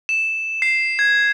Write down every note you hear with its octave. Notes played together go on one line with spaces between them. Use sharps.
E7
C7
G#6